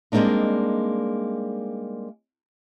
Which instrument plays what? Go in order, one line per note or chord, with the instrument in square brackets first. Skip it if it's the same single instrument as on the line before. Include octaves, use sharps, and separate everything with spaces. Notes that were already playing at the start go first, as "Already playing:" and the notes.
[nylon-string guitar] G3 G#3 A#3 C4 D4 D#4